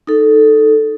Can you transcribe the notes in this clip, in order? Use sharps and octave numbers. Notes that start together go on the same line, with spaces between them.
D#4 A4